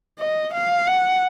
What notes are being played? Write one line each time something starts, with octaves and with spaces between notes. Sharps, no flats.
D#5
F5
F#5